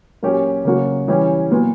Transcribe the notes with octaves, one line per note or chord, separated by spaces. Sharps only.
A#2 F#3 A#3 C#4 G4
C#3 F#3 A#3 C#4 F#4
E3 G3 C#4 G4
A#2 F#3 B3